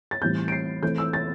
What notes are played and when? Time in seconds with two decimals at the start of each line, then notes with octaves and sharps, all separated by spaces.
0.11 A6
0.22 A2 E3 G3 C4 G6
0.48 D7
0.52 C7
0.83 E3 A3 C4 G6
0.98 E6
1.13 A6